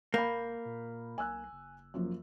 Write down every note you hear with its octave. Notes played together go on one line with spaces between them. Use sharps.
E1 A#3 B5 G6
A#2
B1 G#5 E6 F#6
F#1
F#2 F3 A#3